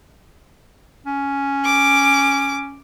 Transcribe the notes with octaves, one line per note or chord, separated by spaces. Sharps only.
C#4
D6